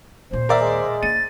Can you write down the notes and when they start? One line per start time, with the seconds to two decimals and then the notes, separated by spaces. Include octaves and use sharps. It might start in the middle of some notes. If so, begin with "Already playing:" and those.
0.31 D#2 A#2 C5
0.49 A#4 D5 E5
0.61 G#3
1.03 A#3 D4 A6 D#7